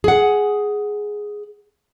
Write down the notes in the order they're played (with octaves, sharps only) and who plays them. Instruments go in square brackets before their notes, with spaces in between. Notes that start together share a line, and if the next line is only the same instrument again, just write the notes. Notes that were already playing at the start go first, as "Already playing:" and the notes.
[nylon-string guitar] G#4 F#5